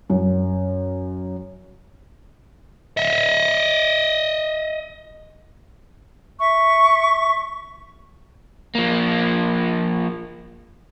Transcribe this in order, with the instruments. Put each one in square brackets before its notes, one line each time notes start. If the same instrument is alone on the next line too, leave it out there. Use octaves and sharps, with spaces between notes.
[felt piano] F#2
[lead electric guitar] D#5 E5
[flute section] E5 C#6
[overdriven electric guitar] F3 A#3